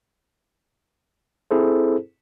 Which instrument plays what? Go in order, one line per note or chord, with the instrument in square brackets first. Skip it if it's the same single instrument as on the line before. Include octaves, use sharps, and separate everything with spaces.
[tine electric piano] C4 E4 G#4 A4 C5